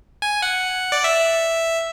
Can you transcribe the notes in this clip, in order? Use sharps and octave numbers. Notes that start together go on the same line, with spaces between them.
G#5
F#5
D5
E5